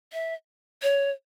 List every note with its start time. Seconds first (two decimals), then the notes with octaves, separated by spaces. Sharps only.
0.13 E5
0.83 C#5